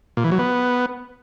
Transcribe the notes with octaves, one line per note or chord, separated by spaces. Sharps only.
A#2
E3
F#3
B3